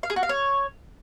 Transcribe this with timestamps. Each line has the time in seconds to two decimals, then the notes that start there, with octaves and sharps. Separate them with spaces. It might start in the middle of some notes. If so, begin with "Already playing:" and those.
0.03 F5
0.10 G#4
0.16 F#4
0.23 F5
0.29 C#5